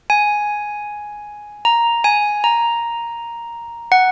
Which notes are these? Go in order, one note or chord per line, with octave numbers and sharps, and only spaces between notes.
G#5
A#5
G#5
A#5
F#5